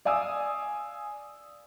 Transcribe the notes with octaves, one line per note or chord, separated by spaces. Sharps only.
D5 F5 G#5 D#6 E6